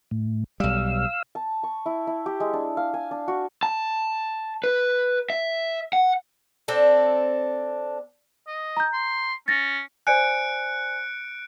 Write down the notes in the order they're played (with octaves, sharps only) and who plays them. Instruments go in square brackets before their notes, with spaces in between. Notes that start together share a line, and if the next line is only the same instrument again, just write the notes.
[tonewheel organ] A2
[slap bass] B1 G3 [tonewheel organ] F5 E6
[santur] A5
C#6
E4
E4
G4
G#3
D4
F5
G#5
D4
F#4
[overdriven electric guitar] A5
B4
E5
F#5
[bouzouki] C4 D4 A4
[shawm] D#5
[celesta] A#5 G6
[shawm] C6
[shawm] C#4 [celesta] A6 A#6
[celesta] C5 D5 G#5 [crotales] F#6 C#7 D7